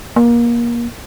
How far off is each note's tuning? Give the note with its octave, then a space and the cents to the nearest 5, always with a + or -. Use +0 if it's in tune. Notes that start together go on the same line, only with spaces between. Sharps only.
A#3 +25